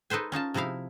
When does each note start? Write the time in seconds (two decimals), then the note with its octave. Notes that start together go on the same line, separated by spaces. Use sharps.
0.10 D#4 A4 B4 C5 G#5
0.32 C#4 D#4 F4 A5
0.54 C3 F3 D#4 E4 F5